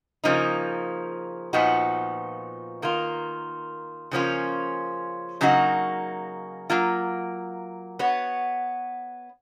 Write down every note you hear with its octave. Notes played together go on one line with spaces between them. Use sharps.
C#3 F3 A#3 D#4
A#2 F3 B3 D#4 F#4
D#3 A#3 F4
C#3 F3 A#3 C#4 F4
C#3 F#3 A#3 D#4 F#4
F#3 A#3 F4
B3 F#4 C#5